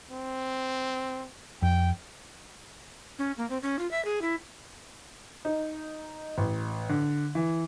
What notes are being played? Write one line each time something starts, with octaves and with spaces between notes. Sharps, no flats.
C4
F2 G5
C#4
A#3
C4
C#4
F4
E5
G#4
E4
D#4
A1
D3
E3